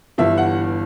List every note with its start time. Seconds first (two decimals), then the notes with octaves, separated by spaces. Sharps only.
0.18 G1 G2 E3 E5
0.38 F#5